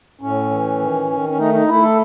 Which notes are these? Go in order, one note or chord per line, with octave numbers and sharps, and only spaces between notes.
A2 C#4
E3
D#3
D#3
C#4
A3 D#4
D#4
A3 E4
A4